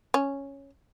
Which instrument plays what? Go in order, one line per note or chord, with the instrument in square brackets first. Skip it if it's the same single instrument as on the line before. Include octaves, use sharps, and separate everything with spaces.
[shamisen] C#4